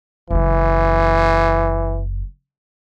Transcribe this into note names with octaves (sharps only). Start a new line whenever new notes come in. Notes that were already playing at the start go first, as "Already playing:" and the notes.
F#1 F#2 E3